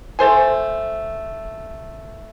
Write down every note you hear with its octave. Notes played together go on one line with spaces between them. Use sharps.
A3 A4 C5 G#5